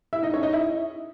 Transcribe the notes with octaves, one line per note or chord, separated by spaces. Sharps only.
E4 E5
D#4 D#5
C#4 C#5
D#4 D#5
E4 E5